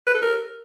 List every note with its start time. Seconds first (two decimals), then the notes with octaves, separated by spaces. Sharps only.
0.07 B4
0.14 A4
0.22 A#4